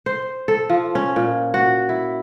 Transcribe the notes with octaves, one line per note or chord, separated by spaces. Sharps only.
C5
A4
F3
C#4
A#2
F#4
E4